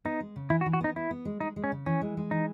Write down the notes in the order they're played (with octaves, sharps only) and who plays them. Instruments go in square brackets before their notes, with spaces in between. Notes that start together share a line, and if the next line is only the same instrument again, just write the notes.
[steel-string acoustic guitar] B3 [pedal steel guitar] D#4
[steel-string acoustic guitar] G#3
C#3
[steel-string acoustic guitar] E3 [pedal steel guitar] E4
[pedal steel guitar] F#4
[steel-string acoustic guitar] E3
[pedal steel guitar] F#4
[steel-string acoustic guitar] B3 [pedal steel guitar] D#4
[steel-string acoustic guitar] B3 [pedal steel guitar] E4
[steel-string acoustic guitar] B3
G#3
[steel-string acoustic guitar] G#3 [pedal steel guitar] D#4
[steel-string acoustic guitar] G#3
[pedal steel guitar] C#4
[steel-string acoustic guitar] C#3
[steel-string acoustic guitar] E3 [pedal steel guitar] C#4
[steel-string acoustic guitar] G#3
G#3
[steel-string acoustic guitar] E3 [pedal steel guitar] D#4